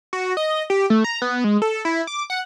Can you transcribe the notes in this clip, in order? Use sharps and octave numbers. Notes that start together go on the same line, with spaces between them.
F#4
D#5
G4
A3
A#5
B3
G#3
A4
E4
D6
F#5